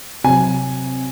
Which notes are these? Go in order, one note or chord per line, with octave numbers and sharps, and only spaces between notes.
C3 F#3 G#5